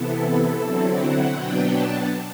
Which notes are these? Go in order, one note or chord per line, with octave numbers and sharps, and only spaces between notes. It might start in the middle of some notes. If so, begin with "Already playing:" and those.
Already playing: C3 E3 B3 E4 A4
D3 F#3 C4 E4
F#5
B2 F#3 B3 D4 G5
A5